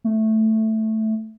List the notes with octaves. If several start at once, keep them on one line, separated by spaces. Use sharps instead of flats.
A3